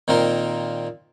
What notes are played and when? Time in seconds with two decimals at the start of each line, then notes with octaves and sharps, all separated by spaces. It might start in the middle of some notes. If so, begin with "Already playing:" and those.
0.08 A#2 D#3 C4 A#4